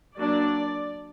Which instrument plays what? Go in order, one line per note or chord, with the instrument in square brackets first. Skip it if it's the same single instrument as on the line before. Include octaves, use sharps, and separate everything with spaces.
[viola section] F#3 A#3 D4 D5